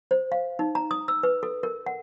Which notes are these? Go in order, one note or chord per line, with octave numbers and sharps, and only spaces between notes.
C5
F5
D#4
A#5
D#6
E6
B4
A4
A#4
F#5